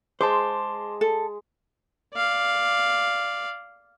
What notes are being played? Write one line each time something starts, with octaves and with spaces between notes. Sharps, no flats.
G#3 C5 A5 C6 D6
A4
D5 F5